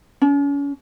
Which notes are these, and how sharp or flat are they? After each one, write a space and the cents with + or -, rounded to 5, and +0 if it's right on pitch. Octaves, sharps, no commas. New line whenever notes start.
C#4 +35